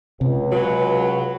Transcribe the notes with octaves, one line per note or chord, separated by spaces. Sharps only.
C#2 C3
F#3 B4